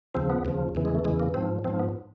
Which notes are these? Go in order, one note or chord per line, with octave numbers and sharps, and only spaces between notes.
D#2 C#3 F3 C4
B3
D#2 C#3 F3
E2 C#3 E3
G#3
A3
E2 C#3 E3 G#3
A#3
G#2 F3 C4
G#2 F3 C4
B3